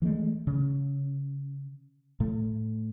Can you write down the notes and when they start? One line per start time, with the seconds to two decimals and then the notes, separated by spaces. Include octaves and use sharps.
0.02 E3 F3 G#3 A3
0.47 C#3
2.20 A2 A3